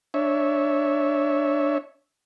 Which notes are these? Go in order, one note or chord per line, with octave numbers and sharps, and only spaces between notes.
D4 C#5 E5